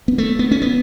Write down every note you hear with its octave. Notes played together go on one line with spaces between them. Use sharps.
B3
A3
B3
C#4
B3